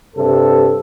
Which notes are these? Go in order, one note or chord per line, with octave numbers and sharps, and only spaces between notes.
G2 C3 A4